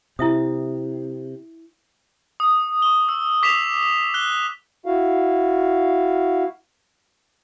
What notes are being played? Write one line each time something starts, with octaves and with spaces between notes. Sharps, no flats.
C3 E4 E5 D#6
D#6
C#6 G7
E6
D6 B6 C7 E7 F7
F#6 G7
E4 F#4 F5